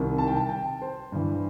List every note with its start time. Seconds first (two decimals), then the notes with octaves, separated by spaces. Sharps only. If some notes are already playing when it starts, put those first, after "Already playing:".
Already playing: C2 C3 D#3
0.18 A5
0.28 G5
0.36 A5
0.49 G5
0.82 C5
1.12 G2 E3